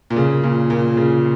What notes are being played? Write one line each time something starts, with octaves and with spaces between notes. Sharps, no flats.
A#2
C#3
A#2
A#2
C#3